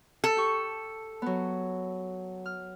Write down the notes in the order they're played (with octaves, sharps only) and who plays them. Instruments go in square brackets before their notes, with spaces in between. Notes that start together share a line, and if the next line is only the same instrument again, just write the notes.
[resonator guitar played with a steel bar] A4
[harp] G4 C#6
F#3 B3
F6